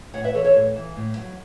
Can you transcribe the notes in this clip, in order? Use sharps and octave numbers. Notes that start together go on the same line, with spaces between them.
A2 C#5 F#5
B4 E5
E3 A4 C#5
A4 C#5
A2
E3
A2
F#3